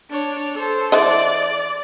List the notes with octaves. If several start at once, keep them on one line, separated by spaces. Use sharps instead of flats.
D4 C#5
A4 C5
E3 C5 D5 D#5